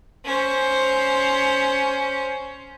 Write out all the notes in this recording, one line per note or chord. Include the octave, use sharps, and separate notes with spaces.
C#4 C5